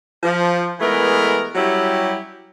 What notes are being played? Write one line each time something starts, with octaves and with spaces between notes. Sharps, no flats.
F3
E3 G#3 A3 B3 A#4
F#3 G3 C#4 E4 G4